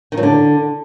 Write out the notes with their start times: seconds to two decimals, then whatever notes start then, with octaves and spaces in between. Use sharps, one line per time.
0.12 D#3
0.17 F#3
0.23 D3